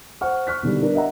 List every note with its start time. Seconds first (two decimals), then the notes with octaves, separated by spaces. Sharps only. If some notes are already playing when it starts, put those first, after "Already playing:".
0.21 C5 F#5 C#6 F6
0.47 C#6 F6 F#6 B6
0.63 B2 D3 D#3 G3
0.81 B3 D4 A#4
0.95 D#5 E5 F#5 A#5